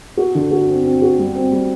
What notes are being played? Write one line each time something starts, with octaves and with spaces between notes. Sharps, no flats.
F#4
D3
F#4
C4
C4
F#4
G3
C4
G3